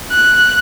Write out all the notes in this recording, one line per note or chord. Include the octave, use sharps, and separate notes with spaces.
F#6